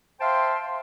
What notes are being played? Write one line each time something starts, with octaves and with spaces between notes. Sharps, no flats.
C5 E5 F5 G5 A5 C6